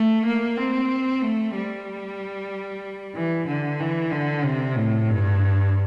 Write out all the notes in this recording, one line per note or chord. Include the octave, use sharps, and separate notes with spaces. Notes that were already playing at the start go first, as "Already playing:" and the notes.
Already playing: A3
A#3
C4
A3
G3
E3
D3
E3
D3
C3
A2
G2